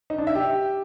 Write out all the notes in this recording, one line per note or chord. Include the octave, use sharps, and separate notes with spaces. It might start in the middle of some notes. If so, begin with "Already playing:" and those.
D#4
D4
E5
G4